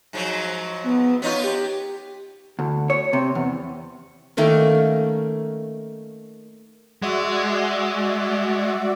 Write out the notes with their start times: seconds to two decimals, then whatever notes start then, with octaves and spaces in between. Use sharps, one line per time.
0.13 G#2 F3 F#3
0.84 B3
1.22 B3 D#4 F4 C#5
1.44 G4
2.59 D2
2.90 C#5
3.13 C3
3.35 E2
4.37 D#3 A3 A#3 C#4
7.02 G#3 F#4 D5 E5